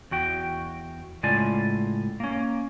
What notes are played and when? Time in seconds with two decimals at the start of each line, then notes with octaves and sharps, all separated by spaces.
0.11 E2 F#4 G5
1.23 A2 C#3 G#3 F4 D5 G#5
2.20 A#3 C#4